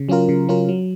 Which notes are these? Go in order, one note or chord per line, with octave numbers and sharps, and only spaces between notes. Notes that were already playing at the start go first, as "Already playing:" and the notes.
Already playing: C#3
F#3 C#4 F4 A#4
C#3
F#3 C#4 F4 A#4
F#3